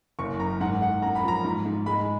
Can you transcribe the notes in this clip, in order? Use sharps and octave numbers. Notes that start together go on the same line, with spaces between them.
F#1 C#6
F#2 A#5
G#2 F#5
G#2 F#5
F#2 A#5
B5
F3 A#5
G#2
G#2
G#3 B5